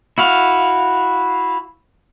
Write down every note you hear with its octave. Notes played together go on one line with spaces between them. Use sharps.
E4 F#4 F5